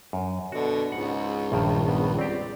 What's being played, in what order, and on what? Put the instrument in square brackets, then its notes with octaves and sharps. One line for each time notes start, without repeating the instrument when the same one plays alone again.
[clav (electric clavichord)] F#2
[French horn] B2 [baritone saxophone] D3 [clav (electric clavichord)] F#4
[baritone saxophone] C#2 [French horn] G#2 [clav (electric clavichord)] F#5
[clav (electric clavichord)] A#1 G2 D#3
[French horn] B3
[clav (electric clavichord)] C4 G4 [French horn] D5